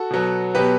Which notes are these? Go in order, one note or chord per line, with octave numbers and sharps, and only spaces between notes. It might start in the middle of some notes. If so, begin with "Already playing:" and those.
Already playing: F#4 A4
B2 F#3 B3
B2 F#3 B3 G4 B4